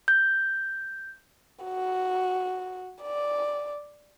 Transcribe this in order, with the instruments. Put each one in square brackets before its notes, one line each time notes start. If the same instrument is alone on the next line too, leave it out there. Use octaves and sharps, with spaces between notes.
[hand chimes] G6
[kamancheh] F#4
D5